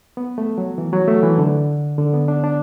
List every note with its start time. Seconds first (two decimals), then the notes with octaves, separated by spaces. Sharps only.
0.17 B3
0.38 A3
0.58 F#3
0.78 E3
0.93 F#3
1.08 A3
1.23 E3
1.38 D3
1.98 D3
2.14 B3
2.28 D4
2.43 D4